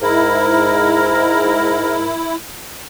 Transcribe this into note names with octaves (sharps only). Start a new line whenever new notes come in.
G#2 E4 A#4